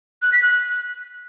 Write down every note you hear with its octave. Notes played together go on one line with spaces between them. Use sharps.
F#6
B6
F#6